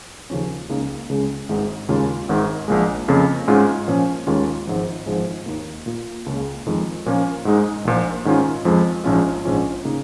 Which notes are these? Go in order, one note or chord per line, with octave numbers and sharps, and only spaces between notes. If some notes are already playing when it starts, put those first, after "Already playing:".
D#2 C#3 F3 C#4
C#2 C#3 A#3 D#4
C#2 C#3 G#3
G#1 G#2 G#3 D#4
D#2 C#3 G#3 F4
G#1 G#2 D#3
A#1 A#2 G#3
F2 C#3 A#3
G#2 G#3 C#4 F4
A#2 F3 C#4
D#2 D#3 G#3 C#4 F4
G#1 G#2 F3
G#1 G#2 F3 G#3
D#2 D#3 A#3
A#2 A#3 F4
C#2 C#3 A#3
F2 D#3 G#3 F4
A#2 F3 A#3 C#4 F4
G#2 G#3 D#4
A#1 A#2 F3
G#2 D#3 C#4 F4
F2 F3 G#3
A#1 G#2 F3 C#4 F4
A#1 G#2 F3 C#4 F4
C#3 A#3 D#4